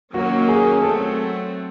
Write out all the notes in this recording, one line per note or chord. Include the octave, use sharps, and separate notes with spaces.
D#3 F#3 A#3 C#4 F#4
G#4
F#3 A3 C4 A4